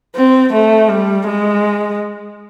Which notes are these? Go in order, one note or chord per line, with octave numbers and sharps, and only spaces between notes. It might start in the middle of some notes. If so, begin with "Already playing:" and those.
C4
A3
G3
G#3